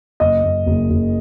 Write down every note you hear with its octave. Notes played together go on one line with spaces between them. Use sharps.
F#1 D#5
F#1
F#1
F#1